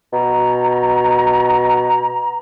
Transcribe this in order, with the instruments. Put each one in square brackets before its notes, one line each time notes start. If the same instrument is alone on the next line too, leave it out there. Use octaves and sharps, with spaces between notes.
[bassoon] B2 [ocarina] A#5